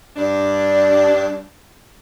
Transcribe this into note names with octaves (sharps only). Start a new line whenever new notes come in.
G2 D4